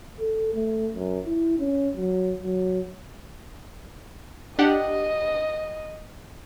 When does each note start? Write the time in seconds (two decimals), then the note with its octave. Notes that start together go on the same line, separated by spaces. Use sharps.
0.20 A4
0.54 A3
0.95 F#2
1.26 E4
1.59 C#4
1.97 F#3
2.43 F#3
4.59 D4 G4 D#5 F#5